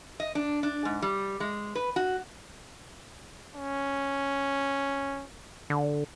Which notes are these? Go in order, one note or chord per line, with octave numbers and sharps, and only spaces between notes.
D#5
D4
D4
G#2
G3
G#3
B4
F#4
C#4
D3